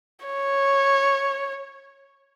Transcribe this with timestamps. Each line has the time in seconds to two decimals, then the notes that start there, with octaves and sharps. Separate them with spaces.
0.26 C#5